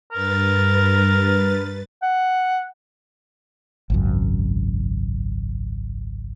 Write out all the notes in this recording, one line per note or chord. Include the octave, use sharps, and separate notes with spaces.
G2 A#4 B4 A6
F#5
G#1 C#2 F#2